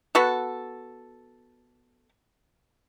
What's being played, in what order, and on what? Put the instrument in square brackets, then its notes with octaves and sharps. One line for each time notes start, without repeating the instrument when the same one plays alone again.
[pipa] B3 F#4 A4